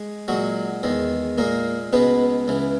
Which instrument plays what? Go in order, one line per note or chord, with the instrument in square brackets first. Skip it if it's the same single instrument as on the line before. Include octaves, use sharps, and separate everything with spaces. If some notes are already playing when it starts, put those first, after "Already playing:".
Already playing: [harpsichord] G#3
A#2 F#3 G#3 F#4
E2 D#3 G#3
A#2 G#3 A#3 A#4
C#2 B2 G#3 B3 B4
C#2 C#3 E3